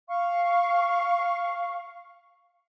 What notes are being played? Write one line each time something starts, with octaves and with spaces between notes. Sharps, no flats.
F5 C#6